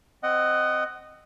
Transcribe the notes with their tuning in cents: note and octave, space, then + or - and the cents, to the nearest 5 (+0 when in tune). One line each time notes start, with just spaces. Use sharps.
C4 +0 D#5 -10 F#5 +20